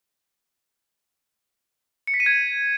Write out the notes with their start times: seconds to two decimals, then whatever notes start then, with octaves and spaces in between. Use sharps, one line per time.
2.07 C#7
2.14 B6
2.20 D#7
2.26 G#6